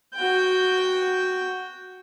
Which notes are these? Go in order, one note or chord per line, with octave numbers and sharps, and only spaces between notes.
F#4 G5